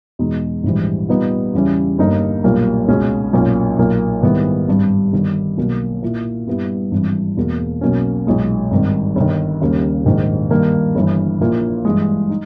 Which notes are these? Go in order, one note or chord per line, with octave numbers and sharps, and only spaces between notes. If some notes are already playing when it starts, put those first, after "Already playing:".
E2 B2 G#3 D#4
A#1 G#2 E3 G3
A#2 G3 B3 D#4
E2 C#3 G3 C#4 E4
G1 G2 G3 A#3 D#4
B1 A#2 G3 A#3
C#2 B2 G#3 C#4
B1 A#2 A#3 C#4
B1 A#2 A#3
G#2 D#3 G3 B3 E4
G#1 G2 G3
G1 G2 D#3
B1 B2 A#3
A#2 A#3 E4
G2 G3 B3 E4
G#1 G2 E3
E1 E2 B2 A#3
B1 B2 A#3 C#4
B1 A#2 G#3 D#4
G#1 G2 D#3
G1 G2 D#3
D#2 C#3 G3 A#3
A#1 G#2 D#3
G2 D#3 A#3
G1 G2 E3
A#1 A#2 A#3 E4
G2 E3 G#3
D#4